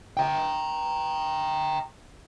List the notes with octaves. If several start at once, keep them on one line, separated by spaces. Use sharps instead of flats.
G5 A#5